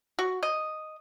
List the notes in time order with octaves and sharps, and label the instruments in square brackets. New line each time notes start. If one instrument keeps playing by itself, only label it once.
[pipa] F#4
D#5